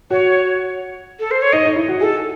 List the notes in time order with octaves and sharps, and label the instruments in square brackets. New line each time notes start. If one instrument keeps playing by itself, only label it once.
[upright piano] F#4 [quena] C#5
[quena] A4
C5
C#5
[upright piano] D#4 [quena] D#5
[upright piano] D#4
E4
F#4
[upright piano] G#4 [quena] A4